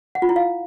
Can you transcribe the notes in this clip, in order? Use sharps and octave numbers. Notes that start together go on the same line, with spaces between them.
F#5
F4
E4
F5